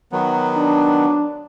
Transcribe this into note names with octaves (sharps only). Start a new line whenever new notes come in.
D#3 F#3 B3
D4